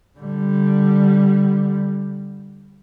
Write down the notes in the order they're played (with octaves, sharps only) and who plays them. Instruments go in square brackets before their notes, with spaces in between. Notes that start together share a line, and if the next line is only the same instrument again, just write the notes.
[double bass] D3 G3